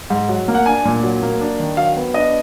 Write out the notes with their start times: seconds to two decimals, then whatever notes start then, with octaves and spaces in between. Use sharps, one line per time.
0.10 G#2
0.29 F#3
0.48 A#3
0.55 F#5
0.66 D4 G#5
0.85 A#2
1.03 F#3
1.22 A#3
1.41 D4
1.59 D#3
1.77 F#3 F5
1.96 B3
2.14 D4 D#5